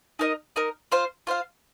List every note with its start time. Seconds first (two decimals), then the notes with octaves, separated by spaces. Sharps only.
0.19 D#4 A#4 D#5
0.56 D#4 A#4 D#5
0.92 F4 C5 F5
1.27 F4 C5 F5